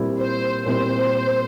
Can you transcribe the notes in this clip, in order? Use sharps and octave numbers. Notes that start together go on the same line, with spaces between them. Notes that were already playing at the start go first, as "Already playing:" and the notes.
Already playing: A#2 G3 C4 E4
C5
A#2 G3 C4 E4 C5